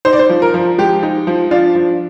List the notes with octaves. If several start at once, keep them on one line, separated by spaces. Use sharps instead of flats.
D#4 C5
D5
C5
F3
A#4
F3
G#3 G4
D#4
F3
D4 F4
F3